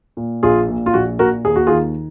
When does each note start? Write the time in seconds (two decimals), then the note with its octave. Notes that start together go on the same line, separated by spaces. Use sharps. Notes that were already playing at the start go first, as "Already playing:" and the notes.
0.17 A#2
0.43 A#1 F4 G#4
0.69 A#2
0.86 F4
0.93 A#1 F#4
1.19 A#2 F#4 A#4
1.45 D#2 G#4
1.56 F#4
1.67 D#3 F4 G#4